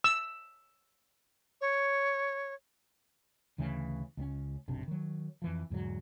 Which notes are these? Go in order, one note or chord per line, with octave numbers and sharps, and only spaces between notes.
E6
C#5
D2 C#3 E3 A3
C#2 G3 C#4
F#1 B1 C3 D4
D#3 F#3
F2 E3 F3
E2 G#2 D3 F#3